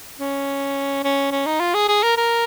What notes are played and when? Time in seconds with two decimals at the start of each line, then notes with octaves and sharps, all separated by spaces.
0.19 C#4
1.04 C#4
1.31 C#4
1.46 D#4
1.60 F4
1.74 G#4
1.88 G#4
2.03 A#4
2.17 A#4